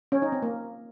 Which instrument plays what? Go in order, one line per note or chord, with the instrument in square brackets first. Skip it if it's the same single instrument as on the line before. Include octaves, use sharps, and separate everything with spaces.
[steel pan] C#4
D#4
C4
A#3